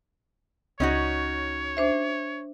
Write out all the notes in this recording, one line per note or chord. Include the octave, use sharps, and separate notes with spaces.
C#2 C#4 D#4 F#4 C#5
D4 C5 E5